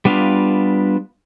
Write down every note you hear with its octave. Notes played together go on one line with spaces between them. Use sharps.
G3 B3 D4 F4 F5